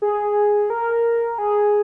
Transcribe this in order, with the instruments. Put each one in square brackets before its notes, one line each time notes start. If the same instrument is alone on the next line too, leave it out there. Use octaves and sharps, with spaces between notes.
[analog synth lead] G#4
A#4
G#4